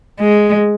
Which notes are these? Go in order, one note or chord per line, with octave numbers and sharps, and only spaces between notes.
G#3